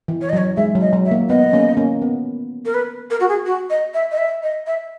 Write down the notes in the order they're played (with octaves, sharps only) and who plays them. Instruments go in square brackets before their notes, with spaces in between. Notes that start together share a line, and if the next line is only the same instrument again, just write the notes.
[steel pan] E3
[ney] C#5
D#5
[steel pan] F#3 [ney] C#5
[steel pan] G#3 [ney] E5
[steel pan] F#3
[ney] D#5
[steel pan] F#3
[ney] E5
[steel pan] A#3
[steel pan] B3 [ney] D#5
[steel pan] A#3 C#4
A#3 C#4
B3
[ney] A#4
B4
A#4
F#4
G#4
F#4
D#5
E5
D#5
E5
D#5
E5